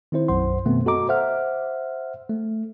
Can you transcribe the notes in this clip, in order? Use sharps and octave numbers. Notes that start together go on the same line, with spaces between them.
D#3 C4 E4 C5
B1 F#2 F#3 C5 F#5 C6
F#2 B2 D#3 A3 B3 C4
F#4 A4 D#5 A#5 D6
C5 E5 F#5 F6
A3